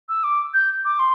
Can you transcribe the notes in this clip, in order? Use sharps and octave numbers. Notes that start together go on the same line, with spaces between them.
E6
D6
G6
D6
C6